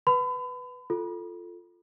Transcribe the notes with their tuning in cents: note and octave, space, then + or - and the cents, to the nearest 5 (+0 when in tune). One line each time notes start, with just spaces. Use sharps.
B4 +0 B5 +35
F4 +0 A4 +0